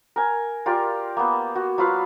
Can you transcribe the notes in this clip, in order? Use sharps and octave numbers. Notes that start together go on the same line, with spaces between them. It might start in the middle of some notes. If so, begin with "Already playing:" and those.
A#4 G#5
F4 G4 A#4 D5
A#3 B3
F#4
F#3 F4 B4 F5